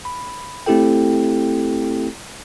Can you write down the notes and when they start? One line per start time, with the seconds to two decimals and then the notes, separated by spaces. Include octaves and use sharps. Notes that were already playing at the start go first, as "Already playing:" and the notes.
0.05 B5
0.66 A3 C4 E4 G4 A4 G5